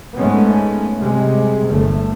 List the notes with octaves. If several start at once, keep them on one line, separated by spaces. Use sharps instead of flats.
G#2 G#3 A3 B3 C#4
C3 G3 G#3
G1 A3